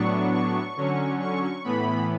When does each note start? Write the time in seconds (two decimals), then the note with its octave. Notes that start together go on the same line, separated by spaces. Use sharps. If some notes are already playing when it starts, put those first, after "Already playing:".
Already playing: A2 F#3 B3 D4 C#6
0.32 C#6
0.76 D3 F#3 C#4
1.20 C#6
1.64 A2 E3 B3 B5